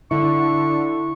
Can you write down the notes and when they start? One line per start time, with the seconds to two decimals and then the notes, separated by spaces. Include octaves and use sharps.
0.11 D3 E4 C#6